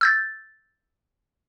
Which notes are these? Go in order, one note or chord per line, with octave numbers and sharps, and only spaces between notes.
E6 G6 A6